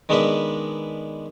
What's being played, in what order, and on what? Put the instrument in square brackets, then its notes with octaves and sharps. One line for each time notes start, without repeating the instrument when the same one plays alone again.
[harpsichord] D#3 G#3 B3 D4 E5